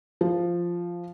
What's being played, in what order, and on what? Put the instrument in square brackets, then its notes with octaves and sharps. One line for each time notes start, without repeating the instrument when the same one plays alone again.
[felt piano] F3